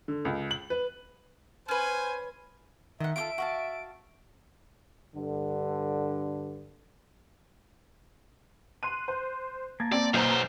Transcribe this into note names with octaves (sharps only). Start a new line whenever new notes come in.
D3
C#2
F#7
B4
C#4 B4 C5 G#5
D#3 D#5 E5 F#5
F4 G4 A4 D7
F#4 F5 A5
G2 D3
C6 F#6 D#7
C5
A#3 A5 G#6
C4 D5
B1 F#2 C5 A#5